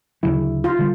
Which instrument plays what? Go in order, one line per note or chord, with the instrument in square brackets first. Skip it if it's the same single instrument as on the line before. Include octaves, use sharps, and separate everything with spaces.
[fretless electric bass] D2 C#3 F#3 [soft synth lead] E4
[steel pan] F4
[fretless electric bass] D3 G3